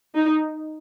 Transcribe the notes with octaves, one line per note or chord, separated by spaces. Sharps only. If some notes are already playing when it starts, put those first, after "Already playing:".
D#4